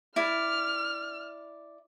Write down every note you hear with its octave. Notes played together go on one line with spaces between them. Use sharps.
E4 D5 F6